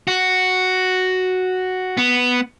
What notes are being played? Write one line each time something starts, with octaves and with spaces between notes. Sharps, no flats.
F#4
B3